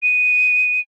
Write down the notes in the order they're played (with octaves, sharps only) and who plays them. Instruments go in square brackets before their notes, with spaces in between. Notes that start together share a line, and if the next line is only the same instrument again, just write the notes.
[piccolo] D#7